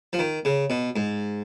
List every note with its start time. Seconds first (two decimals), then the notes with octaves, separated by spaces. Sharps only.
0.13 F3
0.19 D#3
0.45 C#3
0.70 B2
0.96 G#2